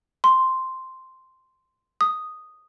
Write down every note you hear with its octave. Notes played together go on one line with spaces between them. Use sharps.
C6
D#6